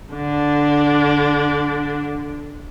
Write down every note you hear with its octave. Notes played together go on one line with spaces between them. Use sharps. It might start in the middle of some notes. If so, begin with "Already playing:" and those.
D3 D4